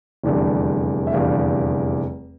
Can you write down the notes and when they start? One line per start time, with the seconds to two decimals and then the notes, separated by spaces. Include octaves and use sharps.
0.24 F1 E2 D3 G3
1.07 E5
1.13 F1 E2 D3 G3 F5